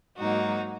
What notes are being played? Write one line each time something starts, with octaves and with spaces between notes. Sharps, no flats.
G#2 F#3 A#3 D#4 F#4